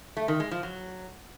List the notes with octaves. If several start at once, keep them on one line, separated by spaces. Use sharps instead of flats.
A3
D#3
G#3
F3
F#3